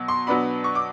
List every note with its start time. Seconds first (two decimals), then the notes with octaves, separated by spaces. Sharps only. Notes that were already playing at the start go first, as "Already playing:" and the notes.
Already playing: B2 F#3
0.08 C6
0.27 B2 F#3 B3 D4 B5
0.64 C#6
0.75 D6